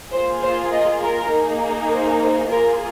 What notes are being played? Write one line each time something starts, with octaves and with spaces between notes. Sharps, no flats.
A#3 F4 G#4 C5
C5
D#5
A#4
A#3 D#4 G#4
C5
C5
A#3 F4 G#4 A#4